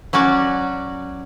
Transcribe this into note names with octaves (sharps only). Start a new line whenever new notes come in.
F#3 C#4 F#4 D5